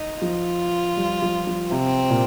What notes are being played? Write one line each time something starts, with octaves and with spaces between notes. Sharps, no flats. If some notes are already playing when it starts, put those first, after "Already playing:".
Already playing: D#4
F3 F4
G3
F3
F3
C3 C4
A#2